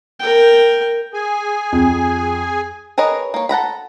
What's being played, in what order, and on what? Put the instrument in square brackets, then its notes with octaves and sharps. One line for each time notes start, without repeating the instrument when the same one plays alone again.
[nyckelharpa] A#4 G5
[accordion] G#4 G#5
[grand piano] F2
[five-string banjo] G#4 A#4 B4 C#5 D#5
A#3 C#5
A4 F#5 A#5 B5